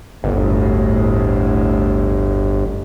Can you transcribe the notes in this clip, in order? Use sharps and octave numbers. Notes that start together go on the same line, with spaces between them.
G1 D2 A2